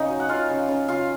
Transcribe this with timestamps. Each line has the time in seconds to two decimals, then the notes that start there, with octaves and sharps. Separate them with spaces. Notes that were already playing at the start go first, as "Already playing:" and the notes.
Already playing: C#3 D#4 D#5
0.09 F#3
0.20 F#5
0.29 C#3 F4 F5
0.49 C#3
0.68 C#3
0.88 C#3 F4 F5